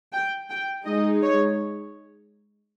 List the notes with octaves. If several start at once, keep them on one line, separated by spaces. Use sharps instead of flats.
G5
G5
G#3 D#4 D#5
C#5